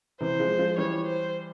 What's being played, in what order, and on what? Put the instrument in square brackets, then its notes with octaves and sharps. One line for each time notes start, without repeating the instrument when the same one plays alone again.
[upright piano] C3 E3 [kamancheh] C5
[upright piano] F3 G#3
F3 G#3
[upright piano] E3 G3 [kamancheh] C#5
[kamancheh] C5